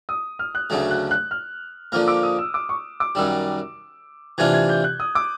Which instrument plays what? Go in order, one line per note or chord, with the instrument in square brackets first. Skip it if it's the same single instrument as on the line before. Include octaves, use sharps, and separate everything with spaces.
[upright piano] D#6
F6
F#6
[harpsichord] D2 C#3 F#3 A3
[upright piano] F#6
F#6
F6
[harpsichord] D3 F3 A#3 [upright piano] F6
[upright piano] D6
D#6
E6
D6
C#6
D6
[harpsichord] F#2 D#3 G3 [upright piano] E6
[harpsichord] C3 E3 A3 D4 F4 [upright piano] G#6
[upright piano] G#6
G6
F#6
D#6
D6